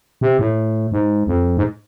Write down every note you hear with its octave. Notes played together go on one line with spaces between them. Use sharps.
C3
A2
G#2
F2
G#2